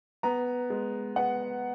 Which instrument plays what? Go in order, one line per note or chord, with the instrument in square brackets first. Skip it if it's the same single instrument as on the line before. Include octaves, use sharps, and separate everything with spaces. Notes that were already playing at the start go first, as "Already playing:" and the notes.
[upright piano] B3 A#5
G#3
B3 F#5